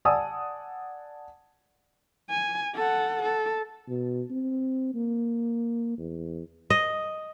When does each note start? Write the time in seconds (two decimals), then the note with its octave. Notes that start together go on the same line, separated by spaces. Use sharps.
0.05 D5 F#5 G#5 A5 D#6 E6
2.30 G#5
2.75 A4 F#5
3.22 A4
3.89 B2
4.30 C4
4.94 A#3
5.98 E2
6.70 D#5